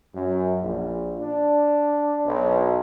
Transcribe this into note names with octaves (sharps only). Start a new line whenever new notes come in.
F#2
A#1
D4
B1